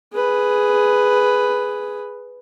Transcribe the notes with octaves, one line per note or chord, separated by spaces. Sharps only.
G#4 B4